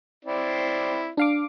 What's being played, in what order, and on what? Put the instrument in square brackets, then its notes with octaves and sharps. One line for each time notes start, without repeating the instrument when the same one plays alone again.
[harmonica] C4 E4 D5
[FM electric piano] D4 F5 D6